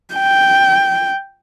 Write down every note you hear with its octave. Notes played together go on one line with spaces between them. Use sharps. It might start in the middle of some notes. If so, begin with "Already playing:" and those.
G5